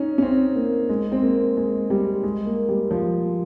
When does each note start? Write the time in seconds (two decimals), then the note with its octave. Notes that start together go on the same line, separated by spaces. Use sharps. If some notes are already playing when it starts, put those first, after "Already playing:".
Already playing: C#4 D#4
0.18 C#4
0.22 C4
0.56 A#3
0.89 G#3
1.12 C4
1.22 A#3
1.57 G#3
1.90 G3
2.23 G#3
2.46 A#3
2.69 G3
2.91 F3